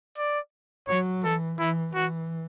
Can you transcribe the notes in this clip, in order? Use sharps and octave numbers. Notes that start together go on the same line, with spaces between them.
D5
F#3 C#5
E3 A4
E3 E4
E3 F#4